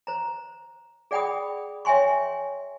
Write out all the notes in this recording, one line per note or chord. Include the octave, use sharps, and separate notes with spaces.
C5 A#5
G#4 D5 F#5 G5 B5 D#6
C#5 E5 G5 G#5 C6 C#6